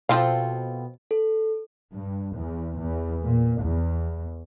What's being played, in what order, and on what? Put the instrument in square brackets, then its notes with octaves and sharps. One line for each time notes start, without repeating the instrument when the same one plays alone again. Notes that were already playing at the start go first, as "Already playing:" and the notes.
[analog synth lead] B2 [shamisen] F3 F5 [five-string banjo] C4 F4 A4
[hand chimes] A4
[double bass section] G2
E2
E2
A#2
E2